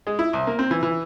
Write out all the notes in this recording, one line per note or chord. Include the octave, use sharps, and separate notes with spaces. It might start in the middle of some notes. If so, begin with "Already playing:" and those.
G#3
E4
C2
A#3
C4
E3
E3